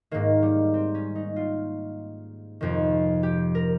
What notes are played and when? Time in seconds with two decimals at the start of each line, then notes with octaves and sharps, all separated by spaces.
0.11 G#2 D#3 A#3
0.42 G3
0.74 C4
0.95 C#4
1.15 D#4
1.36 F4
2.61 F2 C3 D#3
3.23 G4
3.55 A#4